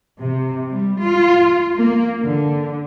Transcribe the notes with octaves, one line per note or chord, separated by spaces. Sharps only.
C3
G3
F4
A#3
D3